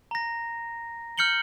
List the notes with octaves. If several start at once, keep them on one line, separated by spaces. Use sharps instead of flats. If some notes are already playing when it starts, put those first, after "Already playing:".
A#5 A#6
F6 G6 C#7 F#7 G7